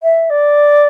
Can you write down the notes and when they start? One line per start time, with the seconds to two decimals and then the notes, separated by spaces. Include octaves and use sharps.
0.02 E5
0.30 D5